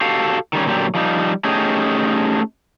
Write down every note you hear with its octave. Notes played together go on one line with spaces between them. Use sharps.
F#4 G4 A4 F5
D#3 G3 C#4
A#2 D3 F#3 G4
F3 G3 D#4
A3 C#4 D#4 G4 G#4